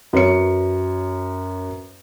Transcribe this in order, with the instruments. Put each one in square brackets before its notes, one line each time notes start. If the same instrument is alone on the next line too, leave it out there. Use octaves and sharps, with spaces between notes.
[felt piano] F#2 B4 C#5 C#7